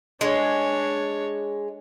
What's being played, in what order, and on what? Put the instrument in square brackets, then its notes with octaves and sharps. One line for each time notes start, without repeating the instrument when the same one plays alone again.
[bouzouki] G#3 [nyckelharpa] D4 C#5